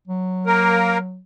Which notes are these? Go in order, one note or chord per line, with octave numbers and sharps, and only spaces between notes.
F#3
A#3 A#4